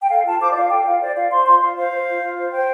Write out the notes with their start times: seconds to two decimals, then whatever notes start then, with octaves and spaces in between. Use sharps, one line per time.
0.01 G5
0.09 A4 F5
0.24 F4 A5
0.40 C5 D6
0.50 D5
0.55 F4 F5
0.70 A4 G5
0.85 F4 F5
1.01 C5 D5
1.15 F4 F5
1.30 C5 C6
1.45 F4 C6
1.60 F4 F5
1.77 C5 F5
1.91 C5
2.07 F4
2.21 F4
2.37 C5
2.52 C5 G5